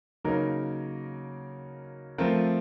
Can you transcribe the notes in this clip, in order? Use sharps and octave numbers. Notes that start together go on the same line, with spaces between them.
C#3 F#3 A#3 D#4 A#4
F3 A3 C4 F4 A#4